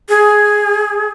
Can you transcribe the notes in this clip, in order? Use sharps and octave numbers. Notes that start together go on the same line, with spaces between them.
G#4